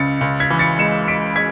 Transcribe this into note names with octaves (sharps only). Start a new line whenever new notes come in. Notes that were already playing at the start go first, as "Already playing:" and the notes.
Already playing: C#2 C#3 A6 C#7
C#2
G#6 B6
E3
A6 C#7
G#3 C#7 E7
G#3 B6 D7
G#3 G#6 B6